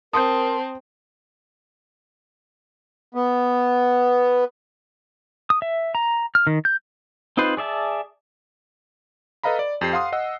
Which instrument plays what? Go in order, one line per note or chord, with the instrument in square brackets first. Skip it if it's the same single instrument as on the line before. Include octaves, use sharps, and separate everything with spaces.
[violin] C4 [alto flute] A#4 [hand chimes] A5 C6 G6 [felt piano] D#6
[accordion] B3
[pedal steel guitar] D#6
E5
A#5
F6
D#3
G6
C4 D#4 F4 B4 C5
G#4 D5 E5 A5
[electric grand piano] A4 B4 D#5 F5 A#5 B5
D5
F2 G4 C7
F5 F#5 C6 D#6
D#5 F#5 E6